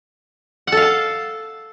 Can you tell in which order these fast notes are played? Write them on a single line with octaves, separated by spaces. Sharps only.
F#5 A4 F5 A5